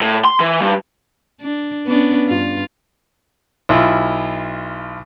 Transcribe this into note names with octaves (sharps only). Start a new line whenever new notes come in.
A2
C6
E3
G2
D4
B3 C#4 D4
G2 F4
B1 E4 F4